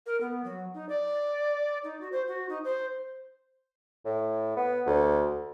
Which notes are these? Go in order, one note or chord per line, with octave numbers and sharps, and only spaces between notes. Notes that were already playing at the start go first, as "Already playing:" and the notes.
A#4
B3
F#3
D#4
D5
D#4
F#4
C5
F#4
D#4
C5
A2
B3
D2